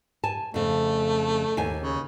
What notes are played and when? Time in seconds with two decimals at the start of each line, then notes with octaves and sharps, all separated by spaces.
0.24 G#5 A5
0.54 F2 C#3 A3
1.57 D#2 G#5
1.81 C#3